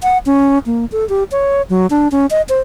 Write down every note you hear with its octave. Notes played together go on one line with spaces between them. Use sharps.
F#5
C#4
A#3
A4
G4
C#5
F#3
D4
C#4
D#5
C5